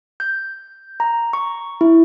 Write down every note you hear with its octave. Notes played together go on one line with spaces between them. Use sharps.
G6
A#5
C#6
E4